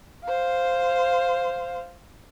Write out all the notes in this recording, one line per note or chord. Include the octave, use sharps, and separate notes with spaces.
C5 F5